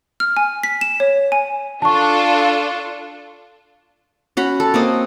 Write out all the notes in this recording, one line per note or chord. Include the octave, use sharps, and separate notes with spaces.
F6
G#5
B6
E7
C#5
G#5
D4 F4 A4 A5 C#6
C#4 F#4 B5
A4
A#3 C4 D#5